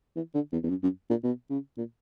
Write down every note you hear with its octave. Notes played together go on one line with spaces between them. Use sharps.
E3
D3
E2
E2
F#2
F#2
A#2
B2
C#3
A#2